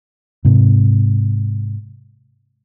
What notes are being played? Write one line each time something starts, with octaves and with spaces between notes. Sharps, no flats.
G#2 C3